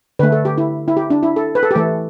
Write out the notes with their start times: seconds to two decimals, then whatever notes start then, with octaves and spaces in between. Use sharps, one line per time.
0.19 D3 A3 B4
0.32 A4
0.45 G4
0.58 E4
0.88 E4
0.97 G4
1.10 D4
1.23 E4
1.36 A4
1.55 B4
1.63 A4
1.71 G4
1.75 E3 A3 A4